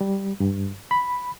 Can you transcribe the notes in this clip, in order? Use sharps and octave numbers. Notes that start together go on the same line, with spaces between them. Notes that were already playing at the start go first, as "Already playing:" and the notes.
G3
G2
B5